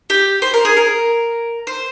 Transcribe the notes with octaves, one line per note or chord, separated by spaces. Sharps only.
G4
C5
A#4
G#4
A#4
C5